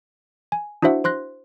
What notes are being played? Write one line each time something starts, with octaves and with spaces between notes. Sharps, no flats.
G#5
D4 E4 F#4 C5 E5 F#5
C5 C6 F#6 A#6